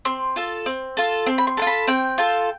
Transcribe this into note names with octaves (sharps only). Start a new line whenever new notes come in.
C4 C6
F4 A4
C4
F4 A4
C4 C6
B5
C6
F4 A4 C6
B5
C4 G5
F4 A4